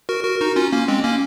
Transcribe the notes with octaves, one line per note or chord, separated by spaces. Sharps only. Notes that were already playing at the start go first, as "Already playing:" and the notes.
F#4 A#4
F#4 A#4
D#4 F#4
C#4 F4
A#3 C#4
G#3 C4
A#3 C#4